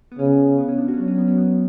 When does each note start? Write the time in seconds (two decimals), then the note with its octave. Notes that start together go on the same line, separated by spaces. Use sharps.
0.12 B3
0.19 C#3 C#4
0.58 B3
0.68 C#4
0.78 D4
0.88 F#4
0.94 C#4
0.98 F#3 D4
1.08 C#4
1.18 B3
1.28 C#4
1.38 B3